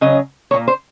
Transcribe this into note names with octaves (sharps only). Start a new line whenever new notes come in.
C#3 F#3 C#4 D#5
A#2 F#3 A#3 C#5
C5